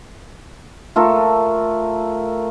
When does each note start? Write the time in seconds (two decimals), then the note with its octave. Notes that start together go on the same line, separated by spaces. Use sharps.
0.96 A3 F4 A4 A#4